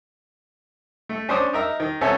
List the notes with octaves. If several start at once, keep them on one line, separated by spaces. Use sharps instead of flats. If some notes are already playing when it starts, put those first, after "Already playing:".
A3
C#4 D4 C5 D6 D#6
D#4 A#4 E5
D#3
C2 B3 C#4 A4 E5 G#5